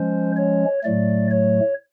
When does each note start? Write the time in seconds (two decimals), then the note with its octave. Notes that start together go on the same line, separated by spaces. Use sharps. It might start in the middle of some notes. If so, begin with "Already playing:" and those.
Already playing: F3 G#3 C#4 C5
0.36 C#5
0.83 A2 F#3 A3 D5
1.31 C#5